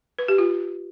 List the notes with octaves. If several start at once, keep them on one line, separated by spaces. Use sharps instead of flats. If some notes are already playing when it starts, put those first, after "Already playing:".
B4
G4
F4